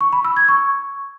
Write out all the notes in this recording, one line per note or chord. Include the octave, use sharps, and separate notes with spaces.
C#6
B5
E6
G#6
C#6